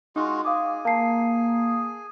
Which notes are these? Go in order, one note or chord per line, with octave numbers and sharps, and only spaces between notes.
G#3 D#4 F4 F#4
G#4 F5 D6
A#3 F5 A5 C7